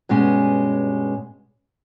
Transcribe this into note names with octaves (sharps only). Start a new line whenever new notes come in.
G2 B2 G#3 C#4 G#5